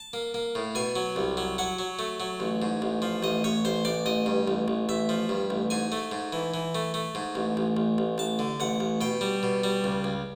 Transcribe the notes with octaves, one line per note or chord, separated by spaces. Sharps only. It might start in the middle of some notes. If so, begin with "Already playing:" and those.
Already playing: A5
A#3
A#3
A2
B2 G#5
F#3
C2
F#3
F#3 F#5
F#3
A3
F#3
A1
G#2
A1
F3
A1 D#5
A1 C#5
A1 C5
A1 D5
A1 D#5
G2
A1
A1
A1 E5
F3
G2
A1
G#2 G#5
A3
G#2
E3
E3
A3
A3
G#2
A1
A1
A1
A1
A1 A5
D3
A1 F#5
A1
B2 G5
G3
B2
G3
C#2
C#2